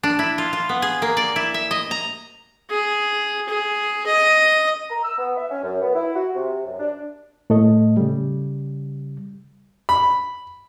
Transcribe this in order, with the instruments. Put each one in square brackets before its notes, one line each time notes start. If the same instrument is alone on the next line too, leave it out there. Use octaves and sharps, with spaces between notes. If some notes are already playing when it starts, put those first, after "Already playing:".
[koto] D4
E4
F4
F4
B3
G#4
A#3
D5
E4
E5
D#5
A#5
[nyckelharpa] G#4
G#4
D#5
[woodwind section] A#5
E6
B3
E5
C#4
F#2
B3
E4
F#4
C3
F#2
D4
[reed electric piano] A2 A3 A4 D#5
C#3 G3
[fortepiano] B5